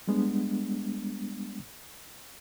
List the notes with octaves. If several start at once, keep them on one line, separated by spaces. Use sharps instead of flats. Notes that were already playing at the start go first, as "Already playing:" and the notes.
G3 G#3 B3 D4